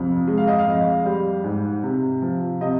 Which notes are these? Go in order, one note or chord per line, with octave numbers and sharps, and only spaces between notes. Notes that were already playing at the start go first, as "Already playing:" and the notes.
Already playing: F2 C3
G#3
F5
D#5
F5
F2
G3
G#2
C3
F3
C3 D#5